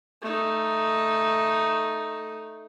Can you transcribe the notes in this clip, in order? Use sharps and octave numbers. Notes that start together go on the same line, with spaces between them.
A3 D#4